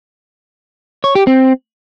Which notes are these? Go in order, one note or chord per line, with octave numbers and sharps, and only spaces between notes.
C#5
G4
C4